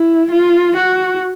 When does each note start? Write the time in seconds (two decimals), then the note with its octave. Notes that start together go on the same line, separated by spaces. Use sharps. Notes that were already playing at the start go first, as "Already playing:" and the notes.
Already playing: E4
0.31 F4
0.76 F#4